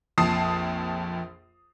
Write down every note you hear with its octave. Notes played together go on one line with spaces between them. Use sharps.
A#1 F2 A5 D#6 C7